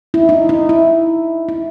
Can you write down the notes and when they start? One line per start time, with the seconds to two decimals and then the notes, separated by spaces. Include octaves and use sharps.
0.14 E4
0.29 D#4
0.49 D#4
0.69 E4
1.49 E4